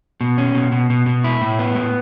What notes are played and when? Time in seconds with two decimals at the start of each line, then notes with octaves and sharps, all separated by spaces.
0.21 B2
0.38 C#4
0.55 B2
0.72 B2
0.90 B2
1.06 B2
1.24 E4
1.41 A2
1.59 B3
1.76 A2